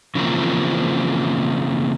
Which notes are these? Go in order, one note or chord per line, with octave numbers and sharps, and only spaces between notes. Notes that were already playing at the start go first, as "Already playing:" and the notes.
C#3 E3 F3 A#3 C4